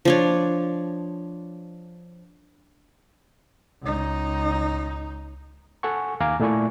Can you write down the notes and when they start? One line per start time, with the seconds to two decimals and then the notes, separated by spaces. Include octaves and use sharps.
0.05 F3 D4 C#5
3.82 C#2 D#4
5.83 A4 F#5 G#5 C#6
6.20 D#2 F5 G#5 A#5 D6
6.40 A#2 A3 E4 D5 G#5 C#6